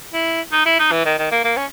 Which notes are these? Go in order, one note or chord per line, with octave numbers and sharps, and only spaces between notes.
E4
D#4
E4
D#4
E3
D#3
D#3
A#3
A#3
C#4